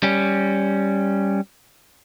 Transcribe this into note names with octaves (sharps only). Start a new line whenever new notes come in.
G3 C#4